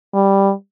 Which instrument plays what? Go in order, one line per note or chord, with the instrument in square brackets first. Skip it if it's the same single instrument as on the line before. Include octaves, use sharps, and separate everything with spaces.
[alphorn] G3